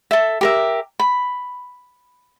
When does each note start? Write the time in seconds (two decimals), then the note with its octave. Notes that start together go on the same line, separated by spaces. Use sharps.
0.11 A4 E5
0.41 G4 A#4 E5
1.00 B5